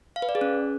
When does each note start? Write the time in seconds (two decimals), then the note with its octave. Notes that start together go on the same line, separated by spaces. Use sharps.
0.16 F5
0.22 B4
0.29 D5
0.35 G#4
0.41 C#4